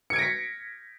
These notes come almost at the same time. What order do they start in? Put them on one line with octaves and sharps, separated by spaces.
C#7 G#6 D7 A#6 B6